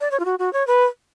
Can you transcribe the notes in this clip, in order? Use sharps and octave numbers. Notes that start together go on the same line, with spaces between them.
D5
C#5
F4
F#4
F#4
C#5
B4